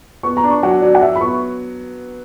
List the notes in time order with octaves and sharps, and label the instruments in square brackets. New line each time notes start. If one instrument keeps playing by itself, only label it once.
[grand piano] B3 [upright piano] C#6
[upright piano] A#5
[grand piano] D4
[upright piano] C#6
[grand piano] F#3 [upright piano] F#5
[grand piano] F#3 [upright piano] D5
[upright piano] F#5
[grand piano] F#3 [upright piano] E5
[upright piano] B5
[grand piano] B3 [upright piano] C#6